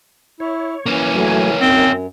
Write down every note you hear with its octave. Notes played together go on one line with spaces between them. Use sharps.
E4 C#5
E3 A#3 C#4
F#3 A3 G#5
F#2 C4 D#4